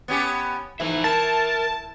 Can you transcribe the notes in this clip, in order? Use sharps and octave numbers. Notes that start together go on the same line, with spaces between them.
B3 C#4 G4
E3 D#4 C5 E5
A#4 A5